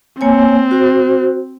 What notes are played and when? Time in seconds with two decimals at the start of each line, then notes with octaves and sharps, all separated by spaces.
0.21 A#3 C4 C#5 G#5
0.71 F#4 C5